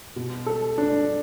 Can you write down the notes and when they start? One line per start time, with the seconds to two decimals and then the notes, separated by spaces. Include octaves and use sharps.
0.16 B2
0.46 A4
0.78 D4